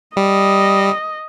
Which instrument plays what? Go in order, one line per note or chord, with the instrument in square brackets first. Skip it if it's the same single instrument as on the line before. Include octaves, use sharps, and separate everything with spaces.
[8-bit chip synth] G3 [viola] D#5